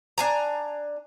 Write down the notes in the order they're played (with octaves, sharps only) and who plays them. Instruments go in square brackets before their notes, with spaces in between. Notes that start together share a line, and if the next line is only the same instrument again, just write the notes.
[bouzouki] D4 G#5 A#5